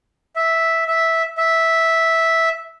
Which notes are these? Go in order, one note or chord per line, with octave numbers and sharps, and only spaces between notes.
E5
E5
E5